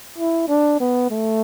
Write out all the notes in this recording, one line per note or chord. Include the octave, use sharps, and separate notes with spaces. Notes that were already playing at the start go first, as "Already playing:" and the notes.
E4
D4
B3
A3